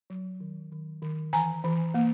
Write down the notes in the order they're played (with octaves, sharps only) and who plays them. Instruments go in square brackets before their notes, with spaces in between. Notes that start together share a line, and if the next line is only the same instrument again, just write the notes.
[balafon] F#3
D#3
D#3
D#3
E3 G#5 A#5
E3
A#3